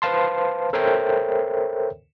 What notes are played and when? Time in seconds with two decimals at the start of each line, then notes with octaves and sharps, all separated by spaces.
0.02 B4 C5 F5 A5 C6
0.73 A4 A#4 C5 C#5 E5 G5